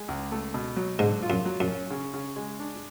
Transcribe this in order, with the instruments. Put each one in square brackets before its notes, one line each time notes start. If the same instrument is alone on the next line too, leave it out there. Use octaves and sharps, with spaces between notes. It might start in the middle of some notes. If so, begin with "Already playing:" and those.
Already playing: [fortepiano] G#3
C#2
A3
B2
F#3
[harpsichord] G#2 [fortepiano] D3
[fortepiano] F4
[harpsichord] F#2
[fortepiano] F#3
[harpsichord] F#2
[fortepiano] C#4
C#3
C#3
G#3
D4